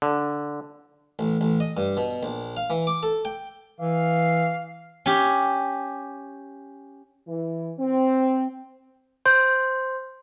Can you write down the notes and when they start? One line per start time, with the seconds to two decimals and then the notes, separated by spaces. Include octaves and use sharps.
0.02 D3
1.19 A1
1.41 A1
1.60 D#5
1.77 G2
1.97 B2
2.23 A#1
2.57 F5
2.70 E3
2.87 D6
3.03 A4
3.25 G5
3.80 E3 F5
5.06 C#4 G4
7.28 E3
7.79 C4
9.26 C5 C6 G6